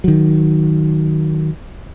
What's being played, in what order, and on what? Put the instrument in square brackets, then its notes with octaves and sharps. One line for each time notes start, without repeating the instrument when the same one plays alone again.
[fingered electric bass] D#3 F#3